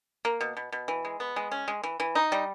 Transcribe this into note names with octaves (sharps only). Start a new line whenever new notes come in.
A#3
B2
B2
B2
E3
G#3
B3
G#3
C#4
G#3
E3
E3
D#4
G3